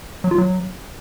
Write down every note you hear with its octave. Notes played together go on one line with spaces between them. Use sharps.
F#3
F4
F#3